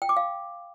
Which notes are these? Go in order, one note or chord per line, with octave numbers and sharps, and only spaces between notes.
G5
D6
F5